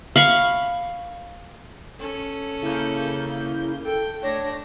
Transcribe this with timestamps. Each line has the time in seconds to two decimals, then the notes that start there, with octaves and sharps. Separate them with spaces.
0.16 F5 B5 C#6
1.99 C#4 A4
2.62 C#3 A#3 E4 G6
3.85 A4 G5
4.23 A3 D4 C#5 A#6